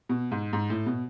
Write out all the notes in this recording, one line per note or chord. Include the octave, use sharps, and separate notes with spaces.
B2
G#2
G#2
A2
B2